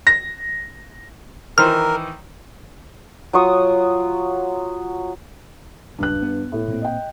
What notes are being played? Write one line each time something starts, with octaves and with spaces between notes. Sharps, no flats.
A#6
D#3 E3 A#4 C5 F6
F#3 F4 C#6 D#6
D#1 C#2 G2 F#6
B3
A2
A#2 A#3 C4
D#5 G5